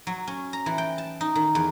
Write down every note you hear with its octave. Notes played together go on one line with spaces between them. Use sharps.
F#3
C#4
A#5
E3
G5
A5
D#4
D#3
E2